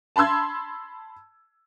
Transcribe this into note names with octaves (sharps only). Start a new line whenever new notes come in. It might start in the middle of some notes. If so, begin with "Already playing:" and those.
A5 B5 C6 E6 G#6